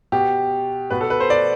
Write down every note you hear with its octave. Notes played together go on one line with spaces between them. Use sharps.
B2 G4
B2 B4
A4
B4
C5
D5